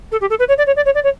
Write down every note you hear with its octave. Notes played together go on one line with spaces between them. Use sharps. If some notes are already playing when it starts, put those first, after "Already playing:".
A4
G4
A4
B4
C#5
D5
C#5
D5
C#5
D5
C#5